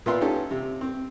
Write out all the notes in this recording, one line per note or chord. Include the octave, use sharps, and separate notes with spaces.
A#2 B3 F4 B4 E5 C6
C#4 D#4 G4 A4
C3
C4